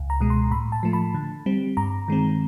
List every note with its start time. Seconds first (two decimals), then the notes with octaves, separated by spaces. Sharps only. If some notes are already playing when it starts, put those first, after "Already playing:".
Already playing: C#2
0.10 A#5
0.21 B2 G#3
0.30 C6
0.51 A2 B5
0.72 A5
0.83 F3 A3
0.93 B5
1.14 D3
1.46 G3 C4
1.77 G2 A#5
2.08 D#3 G#3 C4